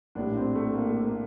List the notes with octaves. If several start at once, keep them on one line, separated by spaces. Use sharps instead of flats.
A#1 A2 G3 D4
C4
A3
A#3
A3
A#3